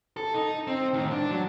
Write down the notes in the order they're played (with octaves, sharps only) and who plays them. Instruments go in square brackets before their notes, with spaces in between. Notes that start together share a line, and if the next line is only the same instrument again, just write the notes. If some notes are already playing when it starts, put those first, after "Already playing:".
[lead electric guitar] A4
D#4
C4
A2 D#3
D4
F#3